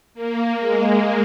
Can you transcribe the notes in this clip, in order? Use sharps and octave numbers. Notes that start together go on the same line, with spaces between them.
A#3
G#3